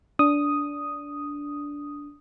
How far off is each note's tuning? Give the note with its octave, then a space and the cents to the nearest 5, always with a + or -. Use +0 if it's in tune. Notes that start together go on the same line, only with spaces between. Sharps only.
D4 -15 D#6 +0